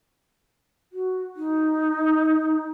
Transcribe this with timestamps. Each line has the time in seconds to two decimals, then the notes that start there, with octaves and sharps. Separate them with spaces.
0.93 F#4
1.36 D#4